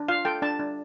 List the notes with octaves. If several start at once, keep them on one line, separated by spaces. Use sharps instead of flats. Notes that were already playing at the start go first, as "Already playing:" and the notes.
Already playing: D4
F4 F5
A4 G5
D4 A5
D4